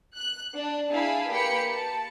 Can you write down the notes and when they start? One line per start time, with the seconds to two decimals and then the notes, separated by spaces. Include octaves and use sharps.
0.16 F#6
0.56 D4
0.92 E4 G#4 F5 G#5 A5 B5
1.28 A#3 G4 B4 G5 B5 C#7
1.73 A5